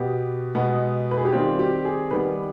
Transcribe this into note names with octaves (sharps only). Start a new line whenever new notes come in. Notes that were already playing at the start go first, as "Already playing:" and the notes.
Already playing: B2 B3 G4
B2 G#3 B3
B4
G#4
G4
D#3 G3 C4 F4
G4
G#4
D#3 G3 B3 B4